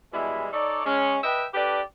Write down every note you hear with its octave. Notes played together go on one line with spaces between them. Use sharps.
B2 E3 G3 G#3 E4
D#4 A4 C#5 D5
G#3 C#4
B4 D#5 E5 G5
D4 G4 A4 B4 D5